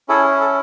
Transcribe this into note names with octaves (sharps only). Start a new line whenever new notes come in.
C#4 E4 G#4 A4
G#4
A4